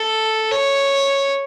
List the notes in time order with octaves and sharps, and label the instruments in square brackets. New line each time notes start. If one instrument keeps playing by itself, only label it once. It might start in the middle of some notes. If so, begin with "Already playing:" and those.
Already playing: [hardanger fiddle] A4
C#5